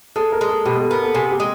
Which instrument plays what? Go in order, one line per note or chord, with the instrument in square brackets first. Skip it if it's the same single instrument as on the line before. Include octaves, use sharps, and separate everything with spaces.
[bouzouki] G#3 [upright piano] A4
[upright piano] A#4
[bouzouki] G#3
[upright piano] A4
[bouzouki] B2 [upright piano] G4
[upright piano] A4
[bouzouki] B3 [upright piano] A#4
[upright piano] A4
[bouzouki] C3 [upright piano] G#4
[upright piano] G4
[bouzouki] G#3